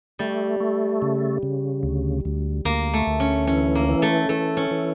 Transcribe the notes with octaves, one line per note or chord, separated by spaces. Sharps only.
G3 A3
A3
C#3
C#3
D2
D2
D2 A#3
A3
D2
C#4
E3 C#4
A#3
E3
A3
E3 A3
C#4
E3